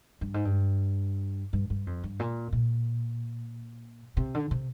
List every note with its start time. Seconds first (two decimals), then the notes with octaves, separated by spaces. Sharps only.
0.21 G2
0.34 G#2
0.45 G2
1.53 G2
1.70 G2
1.87 F2
2.03 G2
2.19 A#2
2.53 A#2
4.17 C3
4.34 D3
4.51 C3